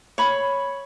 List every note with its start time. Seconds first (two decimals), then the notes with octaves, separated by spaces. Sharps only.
0.18 C#5 B5 C#6